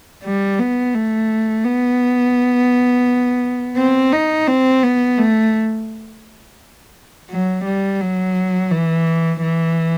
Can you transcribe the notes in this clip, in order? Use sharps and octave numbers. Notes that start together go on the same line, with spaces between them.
G3
B3
A3
B3
C4
D#4
C4
B3
A3
F#3
G3
F#3
E3
E3